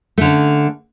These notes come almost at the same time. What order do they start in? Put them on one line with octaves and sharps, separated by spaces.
A3 D3 C#4